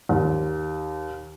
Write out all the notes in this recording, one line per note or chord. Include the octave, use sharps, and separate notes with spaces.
D#2